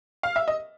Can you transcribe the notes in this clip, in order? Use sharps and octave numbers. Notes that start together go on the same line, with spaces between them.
F5
E5
D#5